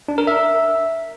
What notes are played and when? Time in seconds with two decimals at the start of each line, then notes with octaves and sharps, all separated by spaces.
0.08 D4
0.18 A#4
0.27 E5